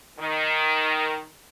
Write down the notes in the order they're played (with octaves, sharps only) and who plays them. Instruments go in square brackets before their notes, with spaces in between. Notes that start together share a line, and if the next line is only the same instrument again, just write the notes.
[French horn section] D#3